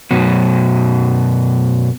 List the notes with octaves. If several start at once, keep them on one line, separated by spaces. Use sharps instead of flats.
F#2 B2 F#3